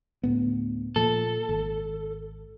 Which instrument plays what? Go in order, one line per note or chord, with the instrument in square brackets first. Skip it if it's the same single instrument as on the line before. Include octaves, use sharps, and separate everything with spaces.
[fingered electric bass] D2 A2 B3
[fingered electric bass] A#2 F3 [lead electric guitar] A4
[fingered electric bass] G#1